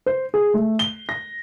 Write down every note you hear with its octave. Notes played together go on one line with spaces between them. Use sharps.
C5
G#4
A3
G7
A#6